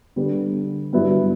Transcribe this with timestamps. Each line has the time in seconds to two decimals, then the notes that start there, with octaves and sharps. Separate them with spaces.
0.16 D3 G3 B3
0.93 G2 F#3 B3 E4